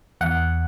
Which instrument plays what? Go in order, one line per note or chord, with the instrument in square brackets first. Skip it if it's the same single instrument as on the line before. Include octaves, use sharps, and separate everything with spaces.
[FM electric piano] E2 F#5